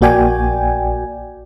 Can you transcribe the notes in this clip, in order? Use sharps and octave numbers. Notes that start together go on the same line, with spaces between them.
A#1 A#3 F#4 D5 G5 G#5